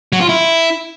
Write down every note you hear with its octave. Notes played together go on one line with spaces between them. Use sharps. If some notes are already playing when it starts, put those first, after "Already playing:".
F#3
F4
E4